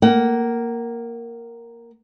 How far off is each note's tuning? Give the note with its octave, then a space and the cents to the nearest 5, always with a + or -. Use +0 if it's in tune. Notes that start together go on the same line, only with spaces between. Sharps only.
A#3 +0 F#5 +30